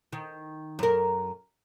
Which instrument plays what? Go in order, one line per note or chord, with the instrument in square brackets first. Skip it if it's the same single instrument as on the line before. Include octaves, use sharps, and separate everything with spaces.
[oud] D#3
F#2 A#4